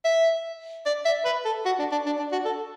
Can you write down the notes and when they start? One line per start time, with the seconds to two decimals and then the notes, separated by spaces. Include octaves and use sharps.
0.05 E5
0.86 D5
1.05 E5
1.25 B4
1.45 A4
1.65 F#4
1.79 D4
1.92 D4
2.06 D4
2.19 D4
2.32 F#4
2.45 A4